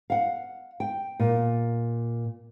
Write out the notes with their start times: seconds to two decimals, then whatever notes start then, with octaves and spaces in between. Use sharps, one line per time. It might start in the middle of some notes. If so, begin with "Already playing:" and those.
0.10 F5 F#5
0.80 G5
1.20 A#2